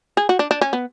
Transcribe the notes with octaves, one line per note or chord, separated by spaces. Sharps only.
G#4
F#4
D4
D4
C#4
B3